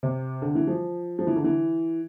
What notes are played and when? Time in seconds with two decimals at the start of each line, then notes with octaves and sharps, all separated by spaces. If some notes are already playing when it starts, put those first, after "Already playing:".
0.03 C3
0.42 D3
0.55 E3
0.67 F3
1.19 F3
1.27 E3
1.36 D3
1.44 E3